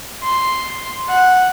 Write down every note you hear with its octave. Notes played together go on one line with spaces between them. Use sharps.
C6
F#5